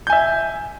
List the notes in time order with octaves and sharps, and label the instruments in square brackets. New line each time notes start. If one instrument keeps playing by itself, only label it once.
[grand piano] G6
G#5
E5